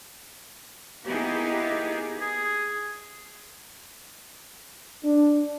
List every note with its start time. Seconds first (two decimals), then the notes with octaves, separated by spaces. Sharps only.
1.06 A#3 B3 D#4 E4 G4 G#4
2.21 G#4
5.04 D4